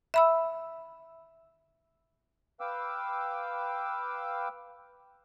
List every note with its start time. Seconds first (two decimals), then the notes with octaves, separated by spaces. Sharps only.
0.14 E5 B5 E6
2.60 B4 F5 G5 D6 E6